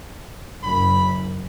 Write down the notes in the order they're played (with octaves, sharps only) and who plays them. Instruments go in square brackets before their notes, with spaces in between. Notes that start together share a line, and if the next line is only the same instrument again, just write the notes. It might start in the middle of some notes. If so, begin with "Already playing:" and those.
[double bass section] F#1 F#2 [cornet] B5